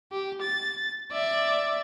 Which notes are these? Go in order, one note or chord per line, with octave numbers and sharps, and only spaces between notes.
G4
A6
D5 E5